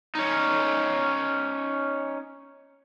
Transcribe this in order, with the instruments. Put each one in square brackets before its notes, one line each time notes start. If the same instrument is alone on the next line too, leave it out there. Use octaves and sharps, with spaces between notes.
[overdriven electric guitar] C#4 D#4